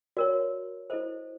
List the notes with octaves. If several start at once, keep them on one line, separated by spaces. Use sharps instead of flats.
F#4 A#4 C#5 D5
E4 A4 C5 D#5